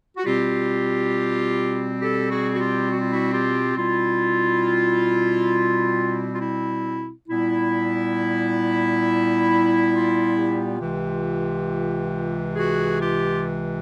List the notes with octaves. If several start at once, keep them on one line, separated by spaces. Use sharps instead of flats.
F#4
B2 G3 C4 F4 G4
G4 A4
F#4 G#4
F#4
F4 G4
F#4
F4
E4 F#4
F4 G4
B2 G3 C4 E4 F4
F4
E4
A#2 G3 B3 E4
F4
F4 G4
C#2 C3 E3
F#4 G#4
F4 G4